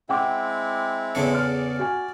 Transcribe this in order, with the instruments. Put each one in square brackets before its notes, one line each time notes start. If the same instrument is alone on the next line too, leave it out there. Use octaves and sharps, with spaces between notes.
[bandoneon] G#3 C4 E4 [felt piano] F#5 G5 D6
[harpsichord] E2 C#3 A4
[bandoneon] D5 [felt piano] F6
[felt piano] F#4 G#5